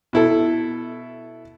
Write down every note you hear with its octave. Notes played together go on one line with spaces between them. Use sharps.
B2 E4 A4